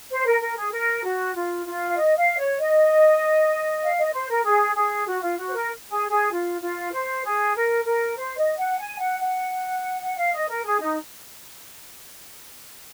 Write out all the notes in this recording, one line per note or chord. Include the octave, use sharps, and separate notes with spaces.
C5
A#4
A#4
G#4
A#4
F#4
F4
F4
F5
D#5
F5
C#5
D#5
F5
D#5
C5
A#4
G#4
G#4
F#4
F4
F#4
C5
A#4
G#4
G#4
F4
F4
C5
G#4
A#4
A#4
C5
D#5
F#5
G#5
F#5
F#5
F#5
F5
D#5
A#4
G#4
D#4